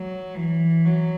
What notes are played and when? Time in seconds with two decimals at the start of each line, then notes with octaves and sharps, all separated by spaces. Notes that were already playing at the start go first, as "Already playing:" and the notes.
Already playing: F#3
0.35 E3
0.85 F#3